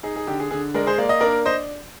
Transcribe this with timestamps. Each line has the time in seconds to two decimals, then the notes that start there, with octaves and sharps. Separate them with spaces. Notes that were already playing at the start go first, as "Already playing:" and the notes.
0.03 D#4 G#4
0.16 G#4
0.27 D3 G4
0.40 G#4
0.51 D3 G#4
0.74 G#3 A#4 D5
0.87 G#4 C5
0.98 A#3 D5
1.09 D#5
1.20 D4 A#4 D5
1.46 C5 D#5